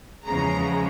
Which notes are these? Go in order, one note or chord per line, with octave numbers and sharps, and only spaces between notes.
E2 C#3 F3 G#3 A#5